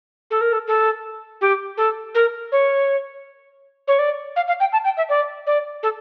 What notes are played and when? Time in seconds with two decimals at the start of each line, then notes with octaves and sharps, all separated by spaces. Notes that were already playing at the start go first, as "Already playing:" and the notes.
0.31 A4
0.41 A#4
0.53 A4
0.67 A4
1.41 G4
1.77 A4
2.15 A#4
2.52 C#5
3.88 C#5
3.99 D5
4.36 F5
4.48 F5
4.60 G5
4.73 A5
4.85 G5
4.97 E5
5.09 D5
5.47 D5
5.83 A4